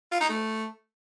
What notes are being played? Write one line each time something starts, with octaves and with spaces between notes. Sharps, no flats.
F4
D#4
A3